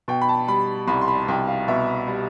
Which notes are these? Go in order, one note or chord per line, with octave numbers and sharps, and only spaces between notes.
B2 G5
B5
A5
G3 B5
C2 B5
C6
B5
C2 G5
F5
B2 E5
G3